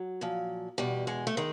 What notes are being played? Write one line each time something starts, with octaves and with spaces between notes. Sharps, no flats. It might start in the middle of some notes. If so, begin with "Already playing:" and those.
Already playing: F#3
A#2 F3
E2 B2 G3
G#3
A3
D#3 G#3